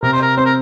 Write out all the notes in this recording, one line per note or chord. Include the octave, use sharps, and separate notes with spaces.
C3 A#4
C5
A#4
C4 C5
A#4